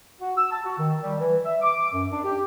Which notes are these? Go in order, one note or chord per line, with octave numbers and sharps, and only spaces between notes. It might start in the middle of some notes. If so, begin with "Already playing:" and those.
F#4
E6
A5
F#4
D#3
G3
E3
E5
D6
F#2
D4
G4